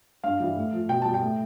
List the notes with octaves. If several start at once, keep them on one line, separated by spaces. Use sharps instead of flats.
G2 F5
E3 G3
A2
F3
B2 G5
G3 A5
G5
A2